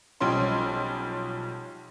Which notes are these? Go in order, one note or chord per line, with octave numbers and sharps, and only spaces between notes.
B1 F3 G3 C#4 C6